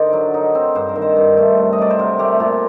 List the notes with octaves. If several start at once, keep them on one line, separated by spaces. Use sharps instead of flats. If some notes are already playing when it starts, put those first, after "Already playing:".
Already playing: D3 D#4 A#4 C5 D5
F#3
D#4
C4
G2 C5
A#4
D#3
C5
G2
A3
C3
D#5
F#3 D5
C5
C3 A#4
A3 G4
A#2